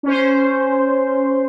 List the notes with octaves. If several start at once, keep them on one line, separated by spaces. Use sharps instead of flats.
C#4 C5